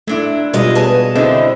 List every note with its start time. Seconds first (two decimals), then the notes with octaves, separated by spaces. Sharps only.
0.07 A#2 A3 D4 E4
0.53 G#2 B2 G3 G#3 F4 D#5
0.75 G#4 B4 C#5 A5
1.15 D3 G#3 A3 C4 E4 D#5